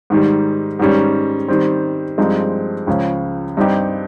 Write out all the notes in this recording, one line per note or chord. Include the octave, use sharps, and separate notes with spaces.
G#2 D#3 G3
G#2 D#3 G3 C#4
D#3 G3 C4
G2 F3 G#3 C4 D#4
C#2 C#3 F3
G2 G3 C4 D#4 G4